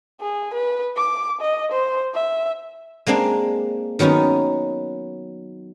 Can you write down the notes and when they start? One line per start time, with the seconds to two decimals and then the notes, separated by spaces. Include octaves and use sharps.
0.20 G#4
0.54 B4
0.97 D6
1.41 D#5
1.72 C5
2.14 E5
3.07 G#3 A#3 C4 D4
3.99 D#3 F#3 B3 C#4 D#4